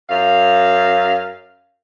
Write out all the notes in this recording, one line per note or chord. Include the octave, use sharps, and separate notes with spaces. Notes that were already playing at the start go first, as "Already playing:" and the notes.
F#2 F5